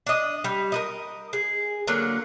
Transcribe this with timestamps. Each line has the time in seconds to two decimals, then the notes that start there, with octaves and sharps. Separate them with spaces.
0.07 D4 D#5
0.44 G3
0.72 A#4 B4 D#5
1.33 G#4
1.87 D3 F#3 A#3